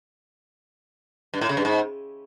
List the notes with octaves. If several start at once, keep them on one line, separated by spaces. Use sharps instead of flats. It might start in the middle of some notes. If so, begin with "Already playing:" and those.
G2
A2
C#3
G2
G#2